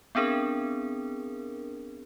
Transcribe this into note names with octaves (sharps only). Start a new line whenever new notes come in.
B3 C4 D4 G#4 A#4